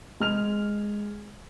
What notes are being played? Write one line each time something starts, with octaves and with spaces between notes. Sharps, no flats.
G#3 F6 F7